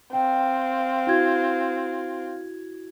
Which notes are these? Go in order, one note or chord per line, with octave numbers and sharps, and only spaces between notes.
C4 F5 G5
E4 F#4 G#6